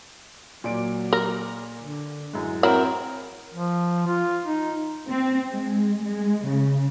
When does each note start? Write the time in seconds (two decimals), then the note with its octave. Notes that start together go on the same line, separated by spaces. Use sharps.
0.64 A#2 F#3 D5 D7
1.13 A#4
1.81 D3
2.33 F#2 A2 G#3
2.63 F#3 C4 E4 A#4
3.54 F3
4.07 F4
4.46 D#4
5.09 C4
5.52 G#3
6.05 G#3
6.47 C#3